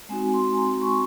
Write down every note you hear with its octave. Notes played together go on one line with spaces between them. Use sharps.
G#3 C4 D#4 F#4 G#5
C6
A#5
C#6